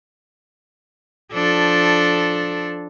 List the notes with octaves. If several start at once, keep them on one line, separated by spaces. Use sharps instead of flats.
F3 D4 A4